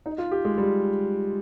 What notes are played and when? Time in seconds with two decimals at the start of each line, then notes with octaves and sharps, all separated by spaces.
0.06 D#4
0.18 F4
0.32 G4
0.45 G#3
0.58 G3